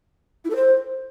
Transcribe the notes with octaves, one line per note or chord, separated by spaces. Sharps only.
E4
A4
C5